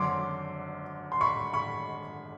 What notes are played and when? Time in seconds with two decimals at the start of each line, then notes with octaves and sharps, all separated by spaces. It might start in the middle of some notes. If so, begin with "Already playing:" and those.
Already playing: G#1 F#2 D3 C6 D6
1.12 C6
1.21 B5 C#6
1.53 B5 C#6